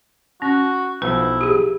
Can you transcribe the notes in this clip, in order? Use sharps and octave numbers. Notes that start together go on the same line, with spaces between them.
C#4 F#4
B1 F3 E4 B4
G4 G#4